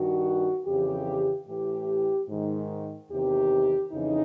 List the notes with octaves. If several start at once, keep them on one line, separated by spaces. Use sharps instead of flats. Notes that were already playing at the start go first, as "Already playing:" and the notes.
Already playing: G2 D#3 F#4
F2 C#3 E3 G4
A2 E3 G4
G#2 D#3
E2 C3 D#3 G4
F2 C#3 E3 D#4